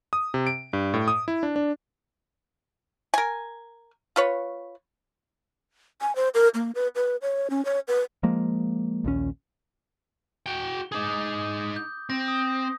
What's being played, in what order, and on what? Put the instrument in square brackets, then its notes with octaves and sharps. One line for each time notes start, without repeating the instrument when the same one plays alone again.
[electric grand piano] D#6
C3
D7
G2
A2
D#6
E4
D4
D4
[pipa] A#4 G#5
F4 B4 C#5
[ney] G#5
C5
A#4
A#3
B4
B4
C#5
C#4
C#5
B4
[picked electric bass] F3 G#3 A#3
A#1 D#2 C#4
[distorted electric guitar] F#4 G5 [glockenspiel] G7
[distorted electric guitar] D#4 G#4 [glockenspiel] D6 D#6
[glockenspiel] G6
[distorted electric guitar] C4 [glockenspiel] A#6
[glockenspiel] D#6